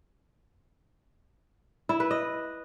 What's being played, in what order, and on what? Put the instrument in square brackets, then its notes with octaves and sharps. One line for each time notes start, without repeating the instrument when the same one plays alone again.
[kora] E4
B4
D#5